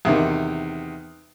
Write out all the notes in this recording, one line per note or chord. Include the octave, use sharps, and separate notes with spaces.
E2 C3 D#3